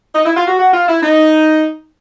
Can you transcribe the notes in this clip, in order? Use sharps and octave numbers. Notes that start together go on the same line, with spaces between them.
D#4
E4
F4
F#4
F#4
F4
E4
D#4